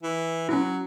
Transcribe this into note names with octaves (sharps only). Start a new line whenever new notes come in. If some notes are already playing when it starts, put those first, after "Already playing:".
E3
F#3 C#4 E4